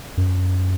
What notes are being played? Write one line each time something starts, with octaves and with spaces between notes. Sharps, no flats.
F#2